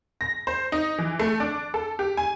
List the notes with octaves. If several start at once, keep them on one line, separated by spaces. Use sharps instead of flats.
A#6
C5
D#4
E3
A3
D4
A4
G4
G#5